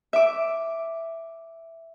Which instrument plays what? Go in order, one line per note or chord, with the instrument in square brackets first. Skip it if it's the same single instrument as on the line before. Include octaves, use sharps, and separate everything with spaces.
[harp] E5 D6